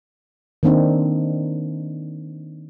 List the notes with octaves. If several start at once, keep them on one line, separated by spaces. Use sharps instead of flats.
D#3 A#3 C4 D4 D#4